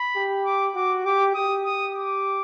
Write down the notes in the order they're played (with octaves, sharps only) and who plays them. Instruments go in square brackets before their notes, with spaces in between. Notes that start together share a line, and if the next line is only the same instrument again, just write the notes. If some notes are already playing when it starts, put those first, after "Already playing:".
Already playing: [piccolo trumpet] B5
[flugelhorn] G4
[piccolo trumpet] D6
[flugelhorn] F#4 [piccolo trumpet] D6
[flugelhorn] G4 [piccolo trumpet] D6
[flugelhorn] G4 [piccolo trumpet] D#6
[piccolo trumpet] D#6
D6